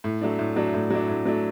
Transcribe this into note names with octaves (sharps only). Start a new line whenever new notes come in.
A2
F#3 A3 D4
A2
F#3 A3 D4
A2
F#3 A3 D4
A2
F#3 A3 D4